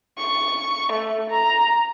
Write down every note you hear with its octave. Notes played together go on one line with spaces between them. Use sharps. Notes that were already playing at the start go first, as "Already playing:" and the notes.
C#6
A3
A#5